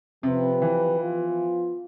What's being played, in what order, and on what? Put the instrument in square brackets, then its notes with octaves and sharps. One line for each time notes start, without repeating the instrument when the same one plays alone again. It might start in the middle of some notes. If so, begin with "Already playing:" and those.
[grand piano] C3 [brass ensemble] F3 C4 G4 B4
[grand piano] E3
[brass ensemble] F3 B3 F4